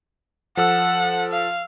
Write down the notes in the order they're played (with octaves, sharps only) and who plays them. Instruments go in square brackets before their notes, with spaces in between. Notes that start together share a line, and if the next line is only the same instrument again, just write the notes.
[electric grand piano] F3 A4 E6 [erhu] F#5
[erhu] F5